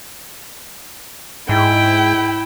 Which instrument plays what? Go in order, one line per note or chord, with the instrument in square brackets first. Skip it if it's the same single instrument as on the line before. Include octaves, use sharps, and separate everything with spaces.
[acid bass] G#2 [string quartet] E4 [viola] G5